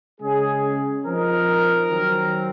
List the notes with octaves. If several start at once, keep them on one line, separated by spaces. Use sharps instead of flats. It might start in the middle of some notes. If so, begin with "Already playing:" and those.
C#3 G#3 C#4 G#4
F3 C4 D#4 A#4
D#3 F#3 C4